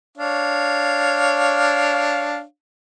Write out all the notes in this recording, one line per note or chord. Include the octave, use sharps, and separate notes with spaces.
D4 C#5 F5